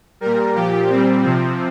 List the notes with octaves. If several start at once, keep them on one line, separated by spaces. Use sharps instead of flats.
A#2 G3 A#4
A#2 F3 G4
A#2 G3 C4
C3 F3 C4